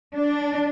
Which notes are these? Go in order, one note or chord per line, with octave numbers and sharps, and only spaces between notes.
D4